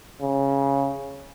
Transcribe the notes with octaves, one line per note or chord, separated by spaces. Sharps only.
C#3